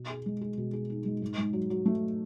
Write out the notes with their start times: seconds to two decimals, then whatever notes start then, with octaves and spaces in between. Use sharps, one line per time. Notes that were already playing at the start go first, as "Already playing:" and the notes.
Already playing: B2
0.10 G#4
0.26 G#3
0.41 G#4
0.57 B2
0.73 G#4
0.90 D#4
1.05 G#3
1.22 G#2
1.38 G#2
1.53 F#3
1.70 F#3
1.86 A3